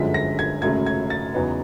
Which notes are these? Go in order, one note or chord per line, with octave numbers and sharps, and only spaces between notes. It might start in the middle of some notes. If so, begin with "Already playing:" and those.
Already playing: G1 F#2 D3 F3 G#3 B6
A#6
G#6
G#1 F#2 C#3 F#3 A3 G#6
G#6
A6
E2 C#3 F#3 B3 D#4